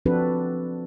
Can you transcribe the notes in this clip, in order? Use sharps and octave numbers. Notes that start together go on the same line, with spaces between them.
F3 C4 D4 F#4 A4 B4